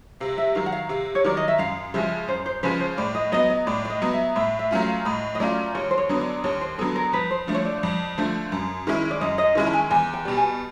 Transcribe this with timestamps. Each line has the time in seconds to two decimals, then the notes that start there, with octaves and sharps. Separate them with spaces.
0.20 C3 F5
0.38 E5
0.55 D#3 F#3 F5
0.66 F#5
0.72 F5
0.89 C3 F5
1.15 C#5
1.25 D#3 F#3 D5
1.37 D#5
1.48 E5
1.58 F#2 F5
1.94 C#3 F3 G#3 C#4 E5
2.28 F#2 C5
2.46 C5
2.63 C#3 F3 G#3 C#4 B4
2.80 C5
2.98 A2 D5
3.15 D#5
3.32 F#3 B3 D#5
3.50 D#5
3.67 A2 D5
3.85 D5
3.90 D#5
4.02 F#3 B3
4.13 E5
4.36 A2 E5
4.59 E5
4.71 F#3 A3 C#4 F4
4.82 F5
5.05 A2 D#5
5.35 D#5
5.40 F#3 A3 C#4 F4 D5
5.75 D#2 C#5
5.91 C5
5.98 C#5
6.09 D3 F#3 B3
6.21 D5
6.44 D#2 C#5
6.61 C5
6.78 D3 F#3 B3 A4
6.96 A#4
7.13 F2 B4
7.31 C5
7.47 D3 F3 A3
7.54 C#5
7.65 D5
7.83 F2
8.18 D3 F3 A3
8.52 F#2
8.87 D#3 G#3 C#4 E4
9.11 D5
9.21 F#2 D#5
9.38 D#5
9.55 D#3 G#3 C#4 E4
9.67 A5
9.73 G#5
9.90 E2 G#5
10.13 G5
10.25 B2 G3
10.37 G#5